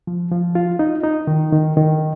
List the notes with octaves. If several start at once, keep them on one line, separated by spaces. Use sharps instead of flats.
F3
F3
F4
D#4
D#4
D#3
D#3
D#3